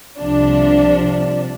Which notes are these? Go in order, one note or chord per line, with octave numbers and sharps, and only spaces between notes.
C2 C3 F3 D4